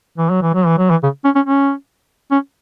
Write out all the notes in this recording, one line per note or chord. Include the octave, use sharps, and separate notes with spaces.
E3
F#3
E3
F#3
E3
F#3
E3
C#3
C#4
C#4
C#4
C#4